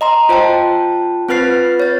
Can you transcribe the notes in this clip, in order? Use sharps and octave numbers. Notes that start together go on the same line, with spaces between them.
D#5 A#5 C6
F4 C5 G5 A5
C4 F4 B4 F6 A6 C7
C#5 A6